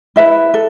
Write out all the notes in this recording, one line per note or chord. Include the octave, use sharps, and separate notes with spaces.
E4 B4 E5
A4